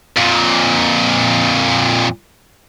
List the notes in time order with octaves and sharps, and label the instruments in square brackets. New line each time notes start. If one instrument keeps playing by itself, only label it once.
[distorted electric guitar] F2 A#2